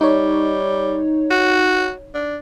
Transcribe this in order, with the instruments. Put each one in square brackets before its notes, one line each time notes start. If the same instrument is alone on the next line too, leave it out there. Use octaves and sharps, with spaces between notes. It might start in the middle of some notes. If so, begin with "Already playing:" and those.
[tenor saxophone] G3 [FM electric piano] D#4 C#5
[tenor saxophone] F#4
D4